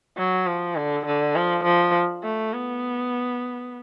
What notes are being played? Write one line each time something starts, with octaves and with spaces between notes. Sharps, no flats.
F#3
F3
D3
D3
F3
F3
A3
B3